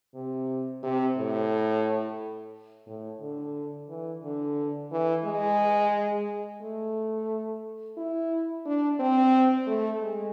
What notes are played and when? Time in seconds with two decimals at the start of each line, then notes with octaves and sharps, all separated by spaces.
0.15 C3
0.83 C3
1.17 A2
2.87 A2
3.21 D3
3.89 E3
4.23 D3
4.92 E3
5.25 G#3
6.61 A3
7.97 E4
8.66 D4
9.00 C4
9.67 A3
10.01 G#3